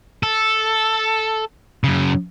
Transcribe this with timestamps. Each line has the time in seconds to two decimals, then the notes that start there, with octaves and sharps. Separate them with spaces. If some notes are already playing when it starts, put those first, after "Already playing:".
0.23 A4
1.84 F#2 C#3